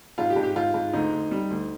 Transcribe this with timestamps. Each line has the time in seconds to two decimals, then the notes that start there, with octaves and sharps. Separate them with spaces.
0.18 G#2 F4
0.30 G4
0.36 G#2
0.43 G4
0.56 G#2 F4
0.74 G#2
0.93 D2 D#4
1.13 D2
1.31 G3
1.50 D2